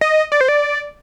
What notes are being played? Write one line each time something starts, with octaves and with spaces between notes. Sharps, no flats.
D#5
D5
C5
D5